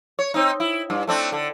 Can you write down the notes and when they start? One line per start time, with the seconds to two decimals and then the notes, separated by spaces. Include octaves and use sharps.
0.19 C#5
0.34 C4 D#4
0.60 E4
0.90 G2
1.07 A3 C4 D4
1.32 D3